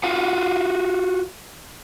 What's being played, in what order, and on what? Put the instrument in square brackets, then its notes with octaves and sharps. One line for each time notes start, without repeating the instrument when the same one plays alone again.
[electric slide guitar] F4 F#4 F5 F#5